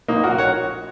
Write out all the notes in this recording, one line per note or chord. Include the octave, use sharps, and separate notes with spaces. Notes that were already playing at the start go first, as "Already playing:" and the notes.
A#1 A#3 D#4
F#4 A#4
C#5 F#5